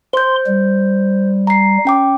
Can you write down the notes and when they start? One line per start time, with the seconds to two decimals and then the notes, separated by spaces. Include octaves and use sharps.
0.13 C5 C6 G6
0.46 G3
1.47 A#5 C7
1.85 C#4 G5 D6